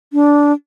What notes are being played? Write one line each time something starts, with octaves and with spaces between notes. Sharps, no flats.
D4